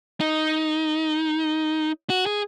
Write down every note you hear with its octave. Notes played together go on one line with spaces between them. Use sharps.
D#4
F#4
G#4